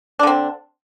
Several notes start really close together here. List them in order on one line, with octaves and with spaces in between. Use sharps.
D4 D3 C4